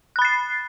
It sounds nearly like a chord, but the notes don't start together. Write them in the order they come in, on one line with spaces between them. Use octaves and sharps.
F#6 B5 A6 C7